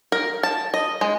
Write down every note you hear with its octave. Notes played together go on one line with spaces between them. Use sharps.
A#4
A5
D#5
G#3